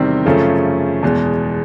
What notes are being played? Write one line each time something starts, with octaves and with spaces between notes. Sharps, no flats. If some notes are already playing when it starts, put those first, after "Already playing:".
Already playing: E2 C3 D#3 G3 C4
F#2 C#3 F3 A3 C#4
E2 B2 G#3